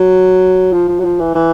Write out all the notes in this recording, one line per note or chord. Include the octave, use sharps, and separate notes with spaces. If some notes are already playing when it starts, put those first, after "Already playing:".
Already playing: F#3
F3
F3
F#3
F3
E3
E3